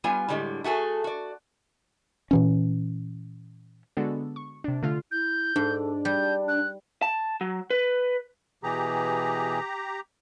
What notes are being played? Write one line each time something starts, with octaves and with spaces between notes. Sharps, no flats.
G3 B3 F4 G#5
A2 D3 G3 G#3
A3 F#4 G#4 A4
F#4 D5
A#2 E3 C#4
D3 G#3 B3 D4 F#4 A4
C#6
C3 D4
D3 A3 F4 F6
E4 G6
G#2 D4 A4
G3 D5 G6
F#6
A5
F#3
B4
B2 E3 G4 G#4 A#5